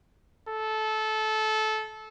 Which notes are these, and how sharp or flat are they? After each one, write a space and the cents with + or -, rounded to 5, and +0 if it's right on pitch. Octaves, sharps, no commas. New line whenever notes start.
A4 -20